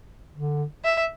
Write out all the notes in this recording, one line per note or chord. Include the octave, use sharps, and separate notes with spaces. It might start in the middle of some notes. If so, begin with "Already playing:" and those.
D3
E5